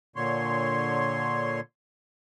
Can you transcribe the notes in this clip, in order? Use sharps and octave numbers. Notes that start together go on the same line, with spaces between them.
A#2 D3 C#5 C6